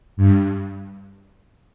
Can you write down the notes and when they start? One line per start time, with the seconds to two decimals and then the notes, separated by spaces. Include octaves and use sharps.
0.17 G2